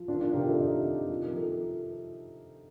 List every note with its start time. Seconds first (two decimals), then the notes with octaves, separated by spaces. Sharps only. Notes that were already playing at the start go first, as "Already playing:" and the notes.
Already playing: F3
0.08 D#3 D4 F4
0.21 D4 F4
0.34 C3 G4 A#4
0.46 F4 A4
0.59 C3 D#4 G4
0.84 D#3
1.09 F3
1.23 A#4
1.35 F3 A4